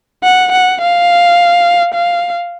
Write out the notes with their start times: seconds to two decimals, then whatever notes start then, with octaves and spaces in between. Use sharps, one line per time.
0.24 F#5
0.52 F#5
0.81 F5
1.94 F5